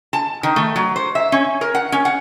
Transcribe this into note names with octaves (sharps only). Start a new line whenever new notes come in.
A5
D#3
A3
F#3
C5
E5
C#4
A#4
F#5
C#4
F#5